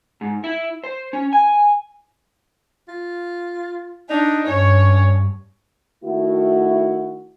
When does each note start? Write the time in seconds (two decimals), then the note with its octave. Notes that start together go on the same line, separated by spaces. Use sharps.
0.21 G#2
0.44 E4
0.84 C5
1.13 C#4
1.33 G#5
2.88 F4
4.10 D4 D#4
4.47 G2 C#4 C#5
6.04 D#3 A3 E4 F#4